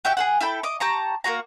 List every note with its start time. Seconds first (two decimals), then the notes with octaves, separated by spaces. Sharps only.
0.05 F#4 G4 E5 G5
0.17 G#4 A4 F#5
0.41 E4 A4 G5 B5
0.63 D#5 D6
0.80 G4 A5 A#5 C#6
1.24 A#3 F4 F#4 A#5